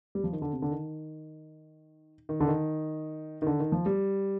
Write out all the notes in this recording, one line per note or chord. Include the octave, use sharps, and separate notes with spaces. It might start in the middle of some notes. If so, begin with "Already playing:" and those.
G3
F3
D#3
D3
C3
D3
D#3
D#3
D3
D#3
D#3
D3
D#3
F3
G3